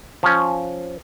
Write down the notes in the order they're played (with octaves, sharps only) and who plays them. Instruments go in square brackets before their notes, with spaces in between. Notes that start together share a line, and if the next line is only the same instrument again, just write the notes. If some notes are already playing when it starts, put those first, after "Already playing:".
[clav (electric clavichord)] F3 C#4